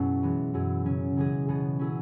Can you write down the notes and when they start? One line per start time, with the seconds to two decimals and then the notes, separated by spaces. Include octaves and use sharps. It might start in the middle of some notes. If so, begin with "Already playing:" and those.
Already playing: F#2 B2 F#3 C#4 E4 G#4
0.23 E3 G#3 B3
0.54 F#2 F#3 E4 G#4
0.85 C#3 F#3 C#4
1.16 C#3 E3 G#3 C#4 G#4
1.48 B2 B3 G#4
1.79 F#3 C#4 E4 G#4